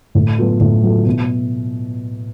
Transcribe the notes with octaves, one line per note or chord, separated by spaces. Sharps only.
A2
F#3 B3 F4 A4
A2
F#3 B3 F4 A4
B2